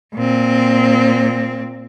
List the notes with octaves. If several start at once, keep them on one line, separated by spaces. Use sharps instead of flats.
A#2 C4